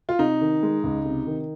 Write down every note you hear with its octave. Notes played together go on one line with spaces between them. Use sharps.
F4
C3 D#4
D#3
G#3
C#2
C3
D#3